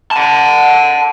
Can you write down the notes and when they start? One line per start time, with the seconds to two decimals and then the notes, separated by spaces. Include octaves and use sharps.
0.11 F#5 A5